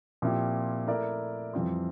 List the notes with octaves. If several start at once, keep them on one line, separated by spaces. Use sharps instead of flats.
A#2 F3 C4 E4 G4
A3 E4 A#4 D5
F2 E3 G3 C4 F4